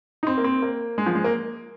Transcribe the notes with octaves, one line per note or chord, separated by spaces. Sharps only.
D#4
C4
A#3
C4
A#3
G#3
F3
G#3
A#3